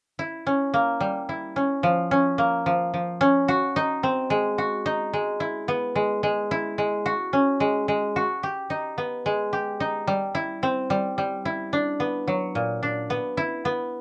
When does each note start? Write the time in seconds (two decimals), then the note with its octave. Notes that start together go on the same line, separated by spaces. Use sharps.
0.19 E4
0.47 C#4
0.74 A#3
1.00 G3
1.29 E4
1.56 C#4
1.83 F3
2.11 C#4
2.38 A#3
2.66 F3
2.94 F3
3.21 C#4
3.48 F#4
3.76 D#4
4.03 C4
4.30 G#3
4.58 F#4
4.86 D#4
5.13 G#3
5.40 E4
5.68 B3
5.96 G#3
6.23 G#3
6.51 E4
6.78 G#3
7.06 F#4
7.33 C#4
7.60 G#3
7.88 G#3
8.16 F#4
8.43 G4
8.70 D#4
8.98 B3
9.26 G#3
9.53 G4
9.80 D#4
10.07 G3
10.35 E4
10.63 C4
10.90 G3
11.18 G3
11.45 E4
11.73 D4
12.00 B3
12.28 F#3
12.55 A#2
12.83 D4
13.10 B3
13.37 E4
13.65 B3